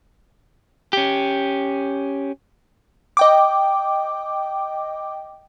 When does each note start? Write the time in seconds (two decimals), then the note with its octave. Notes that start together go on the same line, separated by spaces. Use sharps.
0.93 C#4 G4
3.17 D#5 G5 D6